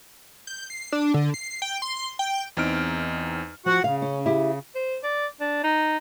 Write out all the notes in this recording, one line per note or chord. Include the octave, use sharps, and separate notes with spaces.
G6
C7
D4
D3
C7
G5
C6
G5
E2 C4 D#4 F6 D7
F3 F#4 F#5
C#3 F5
C#4
E4 G4
C5
D5
D4
D#4